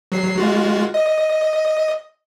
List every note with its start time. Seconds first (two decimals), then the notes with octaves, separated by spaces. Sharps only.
0.12 F#3 C7
0.38 G#3 F4 F#4
0.94 D#5